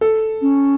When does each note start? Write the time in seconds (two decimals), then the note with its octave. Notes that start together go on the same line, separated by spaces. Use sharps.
0.01 A4
0.42 C#4